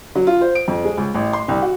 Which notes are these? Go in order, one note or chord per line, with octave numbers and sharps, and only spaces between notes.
F#3
F4
C5
D7
F2
G#3
C#2
A1
C6
C2
F#4